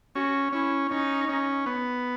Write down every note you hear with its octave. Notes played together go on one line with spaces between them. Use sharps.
C#4 F#4
C#4 E4
C#4 D#4
C#4
B3